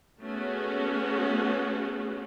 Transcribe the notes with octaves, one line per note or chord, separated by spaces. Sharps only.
A3 B3 C#4 F#4 G#4